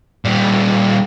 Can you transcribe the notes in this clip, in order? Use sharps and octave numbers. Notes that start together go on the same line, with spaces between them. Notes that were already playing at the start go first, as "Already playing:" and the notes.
A#2 G3